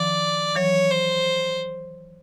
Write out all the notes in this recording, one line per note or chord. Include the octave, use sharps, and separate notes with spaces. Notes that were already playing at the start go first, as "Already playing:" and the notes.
Already playing: D#3 F3 D5
E3 F#3 C#5
C5